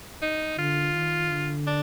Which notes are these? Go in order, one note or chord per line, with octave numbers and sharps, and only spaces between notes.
D#4
D3 F4
D#3
D3
D4